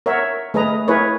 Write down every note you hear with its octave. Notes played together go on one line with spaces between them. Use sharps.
A#4 C#5 E5 F#5
A3 G#4 B4 D#5 A#5
E4 G#4 A#4 B4 C#5